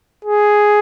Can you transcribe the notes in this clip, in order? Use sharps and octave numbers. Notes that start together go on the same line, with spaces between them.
G#4